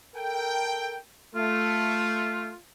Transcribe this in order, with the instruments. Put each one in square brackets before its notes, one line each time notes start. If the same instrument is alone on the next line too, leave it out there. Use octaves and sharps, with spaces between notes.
[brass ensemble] A4 A#4 G5
[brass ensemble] A3 [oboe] F4